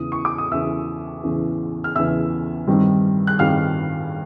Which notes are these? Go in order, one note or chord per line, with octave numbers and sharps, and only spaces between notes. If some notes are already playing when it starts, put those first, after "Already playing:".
Already playing: E2 C#3 E3 D#6
C#6
D6
D#6
E2 C#3 E3 E5 E6
E2 C#3 E3
F6
E2 C#3 E3 E5 E6
G2 D#3 G3 C4
F#6
G2 D#3 G3 C4 F5 F6